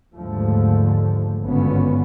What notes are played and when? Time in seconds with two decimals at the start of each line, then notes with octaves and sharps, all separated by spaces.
0.15 D#2 G#2 D3 F3 A3
1.42 G#1 G2 A#2 D3 B3 C#4